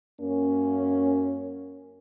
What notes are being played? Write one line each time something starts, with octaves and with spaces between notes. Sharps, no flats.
F#2 A#3 C#4